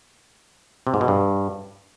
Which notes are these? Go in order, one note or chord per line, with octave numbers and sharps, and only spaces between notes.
C3
G#2
B2
G2